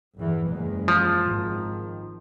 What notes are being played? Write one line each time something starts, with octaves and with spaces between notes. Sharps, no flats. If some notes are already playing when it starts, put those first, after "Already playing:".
G1 E2 E3
F#1 E2 G#3
F3
G#1 D#3